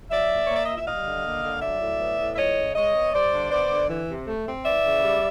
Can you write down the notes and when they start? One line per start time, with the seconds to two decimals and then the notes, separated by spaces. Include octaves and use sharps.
0.11 F#3 D5 E5
0.29 A#2
0.46 A#3 C#5
0.56 D5
0.66 A#2 D#5
0.76 E5
0.86 G3 D#5 F5
1.05 D3
1.24 A#3
1.43 D3
1.62 F#3 D5 E5
1.81 A2
2.00 B3
2.19 A2
2.34 E5
2.37 F3 C#5 D#5
2.57 C#3
2.75 G#3 C#5 D#5
2.95 B3
3.13 G3 C5 D5
3.32 D3
3.51 B3 C5 D5
3.70 D3
3.89 E3
4.08 C3
4.27 A3
4.46 C4
4.65 E3 D5 E5
4.84 C#3
5.02 G3